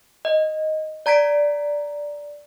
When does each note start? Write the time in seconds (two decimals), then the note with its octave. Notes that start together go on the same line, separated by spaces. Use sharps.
0.25 D#5
1.06 D5 A#5 G#6 B6 D7